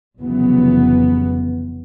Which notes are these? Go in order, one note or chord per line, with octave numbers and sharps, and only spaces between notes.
F1 C#3 E3 F#3 B3